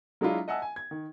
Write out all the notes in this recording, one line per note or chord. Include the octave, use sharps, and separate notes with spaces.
F#3 G#3 D4 E4 F4
D#5 E5 F#5 G#5 A5 E6
G#5
G#6
D#3